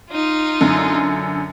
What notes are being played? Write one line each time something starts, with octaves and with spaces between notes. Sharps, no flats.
D#4 F4
F#2 D3